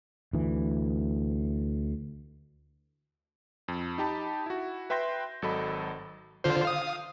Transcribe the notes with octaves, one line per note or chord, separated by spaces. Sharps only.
D2 E3
F2
D#4 G4 A5 B5
E4 F#4
B4 E5 G5 C6 G6 A#6
G#1 F#3 A4 D#5 B5
D3 F4 C5
F5 D#6